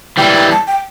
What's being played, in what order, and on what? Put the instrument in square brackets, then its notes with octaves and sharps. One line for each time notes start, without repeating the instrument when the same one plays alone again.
[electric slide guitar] E3 G3 [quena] G5
[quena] G5
A5
G5